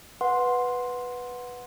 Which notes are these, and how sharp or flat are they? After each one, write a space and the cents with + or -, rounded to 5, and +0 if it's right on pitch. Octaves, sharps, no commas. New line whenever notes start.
B4 +0 F#5 -15 C6 +0